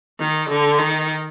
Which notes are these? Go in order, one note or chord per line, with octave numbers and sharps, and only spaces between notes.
D#3
D3
D#3